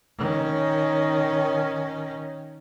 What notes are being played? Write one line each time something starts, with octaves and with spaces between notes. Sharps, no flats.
D#3 C#4